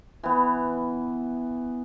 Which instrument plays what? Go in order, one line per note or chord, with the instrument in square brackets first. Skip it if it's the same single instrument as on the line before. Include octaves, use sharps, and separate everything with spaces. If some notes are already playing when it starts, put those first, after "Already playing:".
[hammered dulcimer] E3 B3